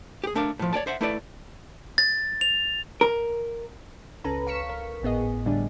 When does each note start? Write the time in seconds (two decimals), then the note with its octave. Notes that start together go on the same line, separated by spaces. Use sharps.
0.24 G4 G#4
0.35 A3 D4 A#4 F5
0.59 A2 F3
0.73 C#5 D5 G5 A5
0.87 C5 E5 F#5
1.01 A3 E4 A4 B4 D5
1.98 A6
2.41 F7
3.01 A#4
4.24 C#2 C#4 A4 B4 A#5
4.47 F5 C#6 B6 C#7 E7
4.69 A#4
5.02 G#1 A2 B3 G#4 D#5
5.45 A2 D3 G3 D4 G#4